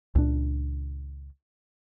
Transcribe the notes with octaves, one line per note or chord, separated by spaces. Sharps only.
C#2 A#2 D4